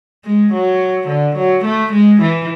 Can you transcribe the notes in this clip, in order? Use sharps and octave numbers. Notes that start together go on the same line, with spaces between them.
G#3
F#3
D3
F#3
A3
G#3
E3